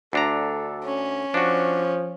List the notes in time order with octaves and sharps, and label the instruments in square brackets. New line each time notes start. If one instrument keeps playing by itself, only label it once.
[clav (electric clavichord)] D2 D4 A#5 [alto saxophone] A4
[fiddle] C#4
[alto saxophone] F3 [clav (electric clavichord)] D4 F#4